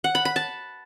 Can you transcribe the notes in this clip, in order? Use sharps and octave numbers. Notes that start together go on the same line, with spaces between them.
F#5
B5
B5
A5